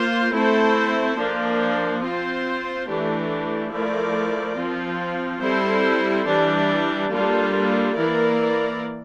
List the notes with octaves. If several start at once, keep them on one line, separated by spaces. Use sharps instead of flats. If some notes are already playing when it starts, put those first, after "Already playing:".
Already playing: A#3 F4 C5
A3 C4 E4 A4 C5
F3 A#3 D4
C4 F4 C5
E3 A3 D4 G4
F3 A3 E4 A#4 D5
F3 C4 F4
G3 C4 E4 A4 C5
E3 G3 D4
G3 A#3 D4 F4 A4
E3 A#3 E4 A#4 D5